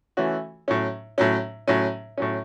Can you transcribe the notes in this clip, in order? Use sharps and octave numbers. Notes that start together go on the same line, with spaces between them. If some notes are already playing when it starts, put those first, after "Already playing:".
E3 A3 C#4 F#4
A2 F#3 C#4
A2 F#3 C#4
A2 F#3 C#4
A2 F#3 C#4